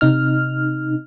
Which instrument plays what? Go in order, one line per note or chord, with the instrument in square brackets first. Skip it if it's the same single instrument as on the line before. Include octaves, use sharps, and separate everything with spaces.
[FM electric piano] C3 D#4 F6